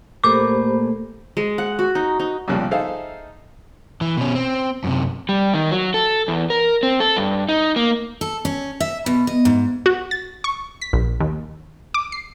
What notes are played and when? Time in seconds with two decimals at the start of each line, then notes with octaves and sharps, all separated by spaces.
0.24 A#2 A3 A#3 G4 C5 B5 D6
1.37 G#3
1.58 F#5
1.79 F#4
1.95 D#4
2.20 D#4
2.48 C2 F2 A#2 C#3 F3 G3
2.71 D#4 G#4 A4 C5 E5 F5
4.01 E3
4.17 B2 C#4
4.35 C4
4.84 F#2 C3
5.29 G3
5.54 D#3
5.71 F#3
5.94 A4
6.28 E2
6.50 A#4
6.83 C4
7.00 A4
7.17 G2
7.49 D#4
7.76 A#3
8.21 A4
8.45 C#4
8.80 E5
9.06 B2
9.27 D#5
9.45 G#2
9.86 F#4
10.11 A6
10.44 C#6
10.81 B6
10.93 A#1
11.20 D#2
11.94 D6
12.12 C7